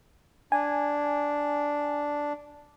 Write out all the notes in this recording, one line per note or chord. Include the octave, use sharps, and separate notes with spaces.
D4 G#5